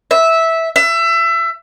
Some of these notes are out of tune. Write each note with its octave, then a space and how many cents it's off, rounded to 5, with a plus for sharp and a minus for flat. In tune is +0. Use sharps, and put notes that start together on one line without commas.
E5 -10
E5 +25